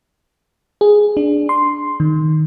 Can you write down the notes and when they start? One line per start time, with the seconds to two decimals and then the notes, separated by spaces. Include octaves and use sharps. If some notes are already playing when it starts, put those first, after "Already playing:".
0.81 G#4
1.17 D4
1.49 C6
2.00 D#3